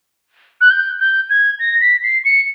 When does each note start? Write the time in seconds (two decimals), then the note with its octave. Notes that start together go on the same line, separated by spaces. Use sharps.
0.61 F#6
0.71 G6
1.00 G6
1.30 G#6
1.59 A#6
1.81 B6
2.03 C7
2.25 C#7